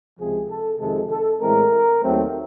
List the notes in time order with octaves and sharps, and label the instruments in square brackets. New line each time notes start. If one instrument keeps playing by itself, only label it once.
[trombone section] C#2 C3 F3 G#3 C4 G#4
A4
F2 C3 D#3 G#3 A4
A4
A2 E3 G#3 C4 A#4
D#2 D#3 F#3 A3 C4